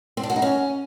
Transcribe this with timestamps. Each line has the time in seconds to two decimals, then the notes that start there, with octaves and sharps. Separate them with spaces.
0.17 C4
0.23 D4
0.30 F#4
0.36 D#4
0.42 C#4